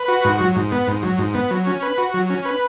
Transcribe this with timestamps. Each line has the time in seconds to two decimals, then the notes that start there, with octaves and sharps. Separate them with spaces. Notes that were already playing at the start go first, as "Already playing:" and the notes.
Already playing: B4
0.08 F#4
0.25 G#2
0.41 F#3
0.56 G#2
0.72 B3
0.88 G#2
1.03 F#3
1.19 G#2
1.34 B3
1.50 F#3
1.67 C#4
1.82 B4
1.98 F#4
2.14 F#3
2.30 C#4
2.45 B4